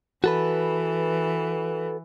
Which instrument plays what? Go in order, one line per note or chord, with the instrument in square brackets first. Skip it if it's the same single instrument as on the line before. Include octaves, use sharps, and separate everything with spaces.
[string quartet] E3 [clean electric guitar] F#4 A4 B4